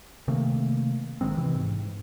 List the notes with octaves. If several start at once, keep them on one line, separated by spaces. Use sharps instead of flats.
C3 D#3 A3 A#3
A1 D#3 G#3 C4
C3 E3
G#2